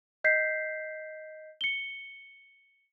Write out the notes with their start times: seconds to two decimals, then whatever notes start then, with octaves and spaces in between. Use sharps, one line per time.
0.24 D#5 G6 B6 C7
1.61 C#7 G7